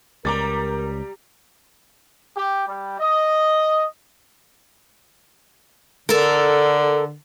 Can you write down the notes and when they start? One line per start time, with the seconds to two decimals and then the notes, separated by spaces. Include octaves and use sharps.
0.25 C#2 G3 A#4 A#5 D6 A6
2.36 G4
2.67 G3
3.00 D#5
6.09 D3 A4 A#4